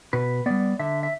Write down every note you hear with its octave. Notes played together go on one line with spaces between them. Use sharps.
B2 B4
G3 B3 D5
D3 E5
E5